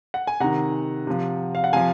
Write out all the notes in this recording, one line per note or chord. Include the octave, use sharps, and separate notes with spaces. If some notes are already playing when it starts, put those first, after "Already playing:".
F#5
G#5
C3 D#3 F#5 A#5
C3 F3
F5
F#5
C3 F3 F5 G#5